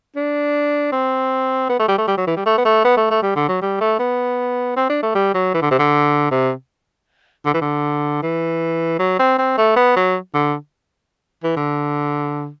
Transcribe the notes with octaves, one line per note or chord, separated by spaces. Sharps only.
D4
C4
B3
A3
G3
A3
G3
F#3
E3
G3
A3
B3
A3
B3
A3
A3
G3
D3
F#3
G3
A3
B3
C4
D4
A3
G3
F#3
E3
D3
C3
D3
C3
D3
E3
D3
E3
F#3
C4
C4
A3
B3
F#3
D3
E3
D3